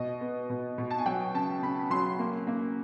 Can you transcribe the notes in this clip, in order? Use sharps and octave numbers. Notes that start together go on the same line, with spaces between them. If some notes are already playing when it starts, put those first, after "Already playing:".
Already playing: B2 D#5
B3
B2
B2
A5
G#5
F#3 G5
C#3 A5
C#3 B5
F#3 C6
A#3
A#3